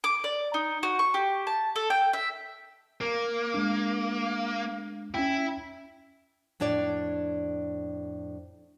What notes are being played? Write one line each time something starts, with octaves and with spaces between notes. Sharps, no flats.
D6
D5
D#4
F#4
C#6
G4
A5
A4
G5
E5
A#3 A#4
G#3 D4
C#4 E4 G5
F2 A2 D4 C#5 D5